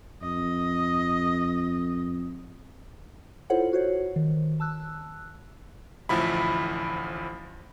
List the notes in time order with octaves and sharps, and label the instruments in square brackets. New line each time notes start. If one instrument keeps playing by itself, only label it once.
[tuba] F2 [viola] D#5
[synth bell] E4 F4 A4 C5 C#5 F#5
F#4 C5 C#5
D#3
A5 E6 F#6
[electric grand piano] A1 D2 F3 E4 B5